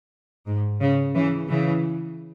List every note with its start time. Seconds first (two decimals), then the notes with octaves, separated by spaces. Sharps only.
0.47 G#2
0.81 C#3
1.15 C#3 E3
1.48 C#3 E3